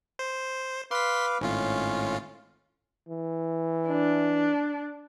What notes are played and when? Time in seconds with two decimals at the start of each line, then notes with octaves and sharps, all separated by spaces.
0.19 C5
0.91 B4 F5 C6 D6 B6
1.41 G#1 A2 C#4 F4
3.08 E3
3.87 D4